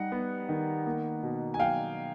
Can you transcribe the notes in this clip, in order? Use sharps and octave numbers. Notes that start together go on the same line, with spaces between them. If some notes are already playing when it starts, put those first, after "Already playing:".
Already playing: G3 D#4 F#5
B3
D#3
A#3
B2
G#5
F#3 F5 G5